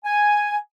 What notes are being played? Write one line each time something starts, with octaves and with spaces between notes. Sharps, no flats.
G#5